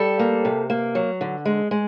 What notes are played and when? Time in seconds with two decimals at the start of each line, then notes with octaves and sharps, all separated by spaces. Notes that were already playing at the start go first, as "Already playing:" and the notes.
Already playing: G3 G4 A4
0.19 A#3
0.45 C3
0.70 A#3
0.95 F#3
1.21 D3
1.45 G#3
1.71 G#3